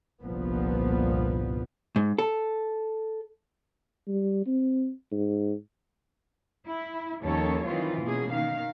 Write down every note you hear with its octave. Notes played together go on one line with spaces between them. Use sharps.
G1 C2 A#2 F3 B3
G#2
A4
G3
C4
G#2
E4
D#2 D#3 F3 C#4 A4 C#5
D#3 E3 F#3 C4 F4
B2 A#3 C#4 G#4
D#3 F5